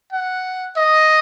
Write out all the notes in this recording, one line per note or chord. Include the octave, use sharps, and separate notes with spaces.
F#5
D#5